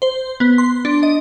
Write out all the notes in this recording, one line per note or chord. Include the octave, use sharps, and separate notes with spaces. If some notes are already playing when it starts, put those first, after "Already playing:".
C5
B3
C6
D4
D#5